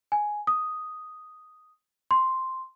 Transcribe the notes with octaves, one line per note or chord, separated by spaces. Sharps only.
G#5
D#6
C6